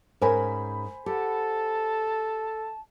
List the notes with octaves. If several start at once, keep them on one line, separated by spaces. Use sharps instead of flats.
G#2 C#4 A#4 C5 G#5 B5
G4 A4 F#5 A5